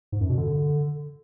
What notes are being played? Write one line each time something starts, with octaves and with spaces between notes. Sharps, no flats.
G#2
F#2
B2
D3